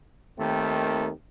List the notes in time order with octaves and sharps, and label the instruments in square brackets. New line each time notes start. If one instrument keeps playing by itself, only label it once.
[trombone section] D#2 D#3 A3 C4